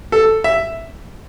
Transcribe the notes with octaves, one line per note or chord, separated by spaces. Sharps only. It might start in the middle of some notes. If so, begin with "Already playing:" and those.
A4
E5